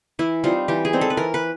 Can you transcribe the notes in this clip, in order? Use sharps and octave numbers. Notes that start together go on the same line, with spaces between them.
E3 E4
G3 C4 D#4 F4
E3 G4
G#4
G3 C4 D#4
A4
B4
E3 A#4
B4